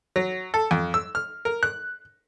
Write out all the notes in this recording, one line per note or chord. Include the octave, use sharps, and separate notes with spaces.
F#3
A4
F2
E6
F6
A#4
F#6